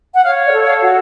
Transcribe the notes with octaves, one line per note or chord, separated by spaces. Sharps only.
F#5
C#5 F5
D5
A4
F5
F#4